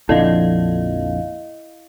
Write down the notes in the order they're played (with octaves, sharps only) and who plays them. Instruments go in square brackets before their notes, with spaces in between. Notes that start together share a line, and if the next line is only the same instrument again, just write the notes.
[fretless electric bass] A#1 F2 D3 [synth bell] E4 D#5 F5